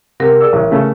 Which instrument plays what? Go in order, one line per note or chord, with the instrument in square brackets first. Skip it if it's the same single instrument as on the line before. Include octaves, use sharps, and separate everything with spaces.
[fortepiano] C3 [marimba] A#4 F#5
[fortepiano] G#4 D5 E6
A1
C#3 A3 C#4